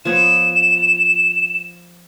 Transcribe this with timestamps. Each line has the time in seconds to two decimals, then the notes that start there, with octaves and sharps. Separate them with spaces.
0.05 F3 B3 C#5 E7